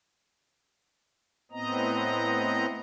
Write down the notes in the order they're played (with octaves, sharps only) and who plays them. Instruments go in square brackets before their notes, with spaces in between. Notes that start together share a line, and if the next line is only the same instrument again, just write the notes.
[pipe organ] A2 B3 C4 D#5 A#5